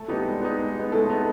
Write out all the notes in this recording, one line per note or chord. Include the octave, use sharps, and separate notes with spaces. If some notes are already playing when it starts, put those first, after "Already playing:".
Already playing: A3 A4
G3 B3 D#4 G4
G#3
B3 D#4
G#3
B3 D#4
G#3 A3 A4
B3 D#4